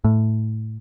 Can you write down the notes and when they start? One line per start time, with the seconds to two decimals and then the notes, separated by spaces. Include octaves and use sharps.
0.04 A2